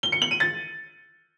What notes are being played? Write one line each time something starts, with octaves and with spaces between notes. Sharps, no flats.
G7
C#7
F#7
D#7
A6